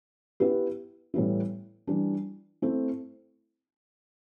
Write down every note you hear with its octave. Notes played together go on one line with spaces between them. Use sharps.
B3 E4 G4 B4
A2 E3 G3 B3 E4
E3 G3 D4
A3 C4 E4